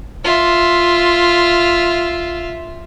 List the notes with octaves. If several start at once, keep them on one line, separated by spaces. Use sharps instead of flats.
F4 E5